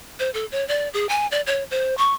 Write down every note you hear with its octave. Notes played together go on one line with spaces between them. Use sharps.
C5
A4
C#5
D5
G#4
G#5
D5
C#5
C5
C#6